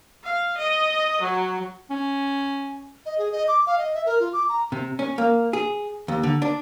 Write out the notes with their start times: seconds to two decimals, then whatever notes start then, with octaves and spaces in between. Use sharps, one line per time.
0.24 F5
0.57 D#5
1.22 F#3
1.90 C#4
3.06 D#5
3.18 G#4
3.32 D#5
3.48 D6
3.67 F5
3.78 D#5
3.94 E5
4.06 A#4
4.20 F4
4.33 D6
4.49 A#5
4.72 C3
4.99 C#4
5.18 A#3
5.53 G#4
6.08 D#2
6.23 D3
6.42 D4